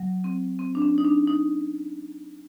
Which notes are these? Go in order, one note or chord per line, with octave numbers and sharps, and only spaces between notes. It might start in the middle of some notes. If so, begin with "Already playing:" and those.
Already playing: F#3
C4
C4
D4
C#4
D#4
D4
D#4